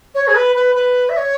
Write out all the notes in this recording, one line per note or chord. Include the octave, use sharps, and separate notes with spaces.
C#5
G#4
B4
B4
B4
E5
C#5